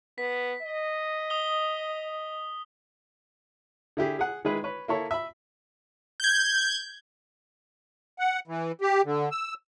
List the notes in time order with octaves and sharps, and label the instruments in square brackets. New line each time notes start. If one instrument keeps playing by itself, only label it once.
[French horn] B3 [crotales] B6
[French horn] D#5
[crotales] D#6 G7
[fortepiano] D3 E4 G4 G#4
G#4 F#5
D#3 G#3 E4 G#4 B4
B4 C#5
A#3 E4 A4 C#5
E5 B5
[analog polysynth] G6 G#6
[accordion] F#5
E3
G4
D3
E6